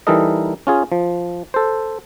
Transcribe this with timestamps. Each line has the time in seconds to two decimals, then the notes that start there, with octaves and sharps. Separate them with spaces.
0.07 E3 G3 D#4 A4 A#4 D#5
0.67 C#4 F4 G#4
0.92 F3
1.54 A4 C5